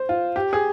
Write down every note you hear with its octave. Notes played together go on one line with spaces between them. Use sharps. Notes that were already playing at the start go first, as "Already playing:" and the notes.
Already playing: C5
F4
G4
G#4